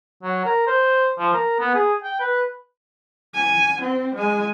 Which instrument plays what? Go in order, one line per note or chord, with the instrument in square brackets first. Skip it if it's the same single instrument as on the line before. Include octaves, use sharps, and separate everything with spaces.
[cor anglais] F#3
A#4
C5
F3
A#4
B3
G#4
G5
B4
[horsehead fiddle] G#5
C4
G#3 G#5